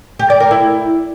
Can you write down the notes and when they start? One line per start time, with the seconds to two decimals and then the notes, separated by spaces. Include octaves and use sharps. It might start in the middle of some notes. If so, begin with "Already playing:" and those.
0.19 G4
0.30 D5
0.40 A#4
0.51 E4